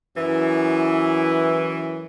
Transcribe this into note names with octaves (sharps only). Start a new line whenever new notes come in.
F#2 E3